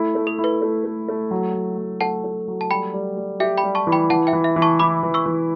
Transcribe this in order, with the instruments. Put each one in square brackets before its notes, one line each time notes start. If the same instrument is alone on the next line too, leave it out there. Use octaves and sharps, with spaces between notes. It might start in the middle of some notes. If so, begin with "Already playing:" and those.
Already playing: [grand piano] A3 E4
A3
[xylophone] A4
[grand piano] E4
[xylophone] B4
[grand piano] A3
A3
A3
F#3
F#3
F#3
[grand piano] A3 [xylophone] F#5 A5
[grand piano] A3
F#3
[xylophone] A5
[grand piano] G3 [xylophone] G5 B5
[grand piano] G3
G3
[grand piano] G4 [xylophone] E5 G5
[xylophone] G5 B5
[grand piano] G3
[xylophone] A5 C#6
[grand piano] E3
[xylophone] G5 B5
[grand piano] E3 [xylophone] F#5 A5
[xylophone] E5 G5
[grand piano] E3
[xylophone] E5
[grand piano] E3
[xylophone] A5 C#6
[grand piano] E4 [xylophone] B5 D6
[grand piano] E3
[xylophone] C#6 E6
[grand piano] E3